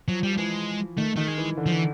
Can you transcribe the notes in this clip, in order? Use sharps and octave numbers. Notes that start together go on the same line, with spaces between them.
F3 F#3
G3
F3
E3 G#3
D#3 A3
D#3 A3
G#3
E3
D3
F3
E3